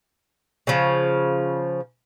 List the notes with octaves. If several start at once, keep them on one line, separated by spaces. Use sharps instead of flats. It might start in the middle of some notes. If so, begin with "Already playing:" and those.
C#3 F3